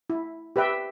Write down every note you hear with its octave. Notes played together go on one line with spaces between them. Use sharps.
E4
G4 B4 E5 G5